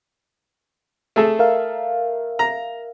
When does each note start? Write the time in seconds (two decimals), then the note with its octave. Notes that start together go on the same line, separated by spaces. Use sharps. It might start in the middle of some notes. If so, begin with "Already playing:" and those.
1.16 A3 G#4 A4
1.39 A#4 E5 F5
2.39 A#5